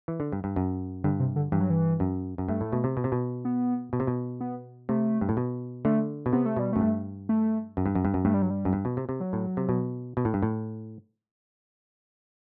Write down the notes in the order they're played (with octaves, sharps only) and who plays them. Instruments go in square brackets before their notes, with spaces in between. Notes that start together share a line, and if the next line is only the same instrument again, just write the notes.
[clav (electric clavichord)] E3
D3
G2
G2
F#2
[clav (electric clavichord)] G2 [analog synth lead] D3
[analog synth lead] C3
D3
[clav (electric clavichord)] G2 [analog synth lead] E3
[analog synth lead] F#3
E3
[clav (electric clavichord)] F#2
F#2
[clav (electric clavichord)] G2 [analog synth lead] A3
[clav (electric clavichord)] A2
B2
C3
B2
C3
B2
[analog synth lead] B3
[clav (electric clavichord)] B2
C3
B2
[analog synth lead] B3
[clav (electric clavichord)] C3 [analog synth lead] A3
[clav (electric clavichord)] G2
A2
B2
[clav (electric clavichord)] D3 [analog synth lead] A3
[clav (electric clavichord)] B2
[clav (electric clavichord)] C3 [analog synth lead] B3
[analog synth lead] A3
[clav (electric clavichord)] B2 [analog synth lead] G3
[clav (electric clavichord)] F#2 [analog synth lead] A3
[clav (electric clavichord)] G2
[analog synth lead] A3
[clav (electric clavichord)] F#2
G2
F#2
G2
F#2
[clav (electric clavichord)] G2 [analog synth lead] A3
[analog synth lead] G3
F#3
G3
[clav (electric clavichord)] F#2
G2
B2
C3
C3
[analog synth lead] F#3
[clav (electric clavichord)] A2
C3
B2
B2
A2
G2
A2